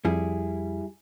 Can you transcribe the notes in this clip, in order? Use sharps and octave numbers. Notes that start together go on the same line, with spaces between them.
F2 G3 E4 G#4